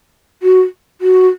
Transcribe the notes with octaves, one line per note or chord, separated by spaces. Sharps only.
F#4
F#4